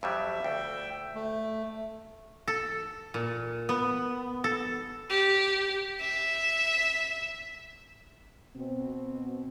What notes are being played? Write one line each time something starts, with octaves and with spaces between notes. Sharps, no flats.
F2 F#3 G3 E5
D2 G5
A3
A4
A#2
B3
A4
G4
E5
B2 C4